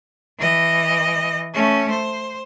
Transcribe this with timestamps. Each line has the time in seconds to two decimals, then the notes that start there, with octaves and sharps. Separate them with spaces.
0.39 E3 D#5
1.54 A3 C#4
1.91 C5